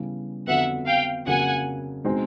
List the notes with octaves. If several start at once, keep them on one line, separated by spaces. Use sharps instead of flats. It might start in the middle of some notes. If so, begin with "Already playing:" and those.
Already playing: C#3 E3 G3 B3
F2 D3 F#3 B3 E5 F#5
F5 G5
F2 C#3 F#3 A#3 F#5 G#5
B2 G#3 C4 D#4